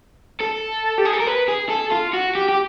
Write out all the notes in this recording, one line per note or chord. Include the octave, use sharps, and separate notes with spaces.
A4
G4
G#4
A4
A#4
B4
G#4
A4
F4
F#4
G4
G4